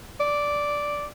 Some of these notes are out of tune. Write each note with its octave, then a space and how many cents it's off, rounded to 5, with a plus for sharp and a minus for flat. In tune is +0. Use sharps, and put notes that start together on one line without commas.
D5 -5